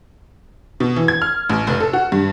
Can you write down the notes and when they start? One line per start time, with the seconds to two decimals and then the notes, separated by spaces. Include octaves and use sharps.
0.80 B2
0.96 E3
1.08 G#6
1.22 F6
1.49 A1
1.67 F1
1.80 A4
1.93 F#4
2.12 G2